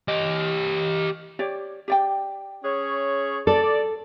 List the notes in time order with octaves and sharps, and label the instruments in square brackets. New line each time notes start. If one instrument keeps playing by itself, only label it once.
[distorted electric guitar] G4 D#5
[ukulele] G4 C#5 D5
G4 D5 G5
[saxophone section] C#4 G#4 C#5
[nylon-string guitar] A4 [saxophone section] D5